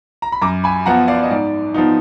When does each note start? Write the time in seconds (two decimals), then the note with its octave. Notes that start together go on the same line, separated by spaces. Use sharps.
0.22 A#5
0.32 B5
0.42 F#2 A#5 D6
0.64 G#5 B5
0.86 F3 B3 F#5 A#5
1.08 D5 F5
1.23 D#5
1.30 G#2 D5
1.74 F3 B3 D#4